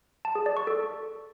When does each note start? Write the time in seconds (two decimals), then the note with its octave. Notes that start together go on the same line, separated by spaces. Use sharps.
0.25 A5
0.35 G#4
0.46 D5
0.57 C#6
0.67 A4